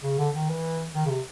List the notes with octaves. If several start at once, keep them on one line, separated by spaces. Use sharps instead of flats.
C#3
D3
D#3
E3
D#3
C#3
C3